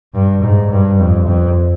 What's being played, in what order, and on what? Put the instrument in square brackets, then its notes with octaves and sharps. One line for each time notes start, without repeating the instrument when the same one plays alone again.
[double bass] G2
G#2
G2
F2
F2